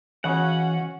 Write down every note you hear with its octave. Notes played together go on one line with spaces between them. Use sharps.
C#3 E3 C#4 F#4 D#5 F#5